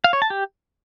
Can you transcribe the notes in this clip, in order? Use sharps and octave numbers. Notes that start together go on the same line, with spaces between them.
F5
C#5
A5
G4